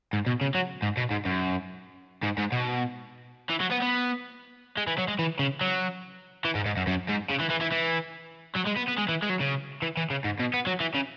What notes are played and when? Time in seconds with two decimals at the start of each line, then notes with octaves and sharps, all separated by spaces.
0.13 G#2
0.26 B2
0.41 C#3
0.55 F#3
0.82 G#2
0.97 B2
1.11 G#2
1.26 F#2
2.23 G#2
2.38 G#2
2.52 B2
3.50 E3
3.60 F#3
3.71 B3
3.82 B3
4.77 G#3
4.87 E3
4.98 F#3
5.08 G#3
5.19 E3
5.39 C#3
5.61 F#3
6.45 E3
6.55 G#2
6.66 G#2
6.77 F#2
6.87 F#2
7.08 G#2
7.30 C#3
7.40 E3
7.50 E3
7.61 E3
7.72 E3
8.56 F#3
8.67 G#3
8.77 B3
8.88 B3
8.98 G#3
9.09 E3
9.22 G#3
9.29 F#3
9.40 C#3
9.82 E3
9.97 E3
10.10 C#3
10.24 G#2
10.39 B2
10.54 B3
10.67 F#3
10.80 E3
10.95 C#3